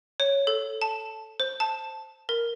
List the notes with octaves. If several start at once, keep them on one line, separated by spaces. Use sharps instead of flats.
C#5
A4
A5
C5
A5
A#4